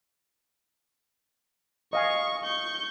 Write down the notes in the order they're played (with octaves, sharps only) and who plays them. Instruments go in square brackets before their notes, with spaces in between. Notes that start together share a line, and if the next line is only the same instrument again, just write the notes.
[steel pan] D#5 F5 G#5 [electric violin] C#6
[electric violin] C#6 G6